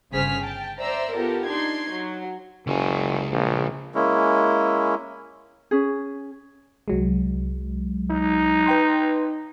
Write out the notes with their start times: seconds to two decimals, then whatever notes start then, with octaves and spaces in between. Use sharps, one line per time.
0.12 G1 C#3 G#4 C5 F6 B6
0.42 G5 A5
0.79 C5 D5 E5 A#5 E6
1.14 B3 F4 G4 A4 A#4
1.47 D4 D#4 C6 G#6
1.92 F#3
2.67 F#1 C#2 G#4
3.31 A#1
3.95 G#3 A#3 C#4 E4
5.71 C#4 G#4
6.88 C2 F#3 G#3
8.10 D#4
8.66 B4 G5 C6